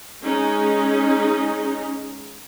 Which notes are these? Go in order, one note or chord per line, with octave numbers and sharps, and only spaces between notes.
G#3 C#4 D#4